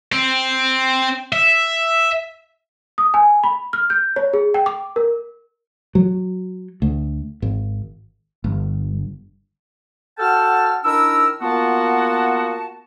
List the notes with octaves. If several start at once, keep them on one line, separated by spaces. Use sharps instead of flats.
C4
E5
D#6
G#5
B5
F6
G6
C#5
G#4
G5
D6
A#4
F#3
D2
G#1
G1
F#4 A4 F#5 G5 A5 F6
D#3 D4 E4 A#4 E6
A#3 B3 F4 F#4 F#5 A5